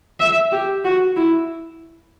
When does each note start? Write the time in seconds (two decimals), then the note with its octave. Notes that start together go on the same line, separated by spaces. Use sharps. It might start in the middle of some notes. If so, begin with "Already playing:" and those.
0.20 E5
0.52 G4
0.85 F#4
1.16 E4